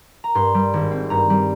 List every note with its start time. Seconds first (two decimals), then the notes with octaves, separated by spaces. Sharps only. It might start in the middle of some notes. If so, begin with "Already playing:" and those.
0.24 A#5
0.35 G2 C6
0.54 G3
0.74 G#1
0.91 C4
1.10 G2 A#5
1.30 G3